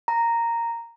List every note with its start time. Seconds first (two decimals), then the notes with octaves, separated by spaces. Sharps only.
0.08 A#5